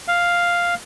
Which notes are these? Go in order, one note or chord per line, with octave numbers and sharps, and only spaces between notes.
F5